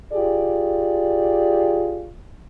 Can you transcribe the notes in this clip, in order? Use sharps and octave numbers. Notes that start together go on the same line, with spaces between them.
F4 G4 G#4 D5